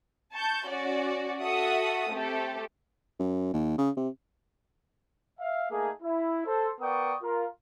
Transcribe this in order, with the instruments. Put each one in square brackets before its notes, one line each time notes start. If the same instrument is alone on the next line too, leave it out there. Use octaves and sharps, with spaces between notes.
[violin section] A5 C#6 G6
C#4 F#4 D5
F#4 A4 E5 F#5 D#6
A3 C4 G4 A4
[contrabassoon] F#2
D#2
C#3
C3
[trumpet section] E5 F5
A3 A#3 D#4 G#4
E4
A4 C5
B3 A#4 D5 G5 C#6 D#6
F4 A#4